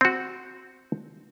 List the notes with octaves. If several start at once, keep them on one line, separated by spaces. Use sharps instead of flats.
C4 F#4